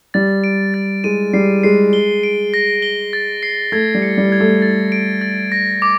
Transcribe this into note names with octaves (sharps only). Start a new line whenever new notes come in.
G3 A6
D7
A6
G#3 D#7
G3 C7
G#3 C7
G7
D7
A#6
G7
A6
C7
A3 G#6
G3
C#7
G3
G#6
A3
A6
D7
A6
A#6
D6